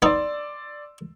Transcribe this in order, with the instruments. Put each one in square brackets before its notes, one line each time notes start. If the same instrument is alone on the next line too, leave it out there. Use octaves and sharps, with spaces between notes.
[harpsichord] B3 D#4 [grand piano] D5 C6 E6